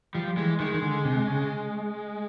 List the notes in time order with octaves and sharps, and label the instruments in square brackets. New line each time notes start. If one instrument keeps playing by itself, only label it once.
[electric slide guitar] F3 [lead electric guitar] G3
[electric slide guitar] E3 [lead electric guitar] G#3
[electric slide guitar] D#3 [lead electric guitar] G#3
[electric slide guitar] D#3
D3
C3
C#3